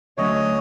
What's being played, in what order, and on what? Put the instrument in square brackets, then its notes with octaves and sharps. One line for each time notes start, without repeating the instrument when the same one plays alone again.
[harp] D2 D3 F#3 A3 C#4 [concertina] C#5 D#5